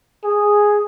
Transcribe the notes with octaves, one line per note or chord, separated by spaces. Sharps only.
G#4